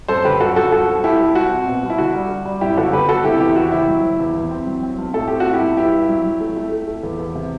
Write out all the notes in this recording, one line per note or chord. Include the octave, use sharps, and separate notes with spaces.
F#2 A4 C5
D3 G4 B4
F#2 F#4 A4
F#2 F#4 A4
C2 F#4 A4
C2
C2 E4 G4
C2
C2 F#4
C4
B2
C2
E4
D3 F#4
G3
G3
G3
F#2 E4 G4
G1 F#4 A4
D3 G4 B4
G1 F#4 A4
C3 E4 G4
E2 E4 G4
E2 F#4
F#1 E4 G4
F#3
F#1
E2
E2
C4
F#3
C4
B1
A2 A4
C4 G4
F#4
A2
E4 G4
B1
G2 E4 G4
G2
F#3
F#3
A3
A3
A3
A3
E2
E2
C3